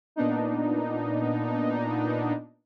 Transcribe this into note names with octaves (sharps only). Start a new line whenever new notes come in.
A#2 B3 D4 D#4